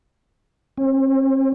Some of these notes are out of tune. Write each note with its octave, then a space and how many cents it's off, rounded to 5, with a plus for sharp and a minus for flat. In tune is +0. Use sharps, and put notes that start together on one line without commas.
C4 +45